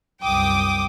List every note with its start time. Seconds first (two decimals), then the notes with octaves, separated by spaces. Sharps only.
0.23 C2 F#2 G5 D6 D#6